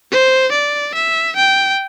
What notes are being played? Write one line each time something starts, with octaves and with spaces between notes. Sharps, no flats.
C5
D5
E5
G5